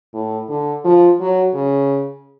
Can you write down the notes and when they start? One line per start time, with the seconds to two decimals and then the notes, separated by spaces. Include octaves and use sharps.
0.14 A2
0.49 D3
0.84 F3
1.20 F#3
1.54 C#3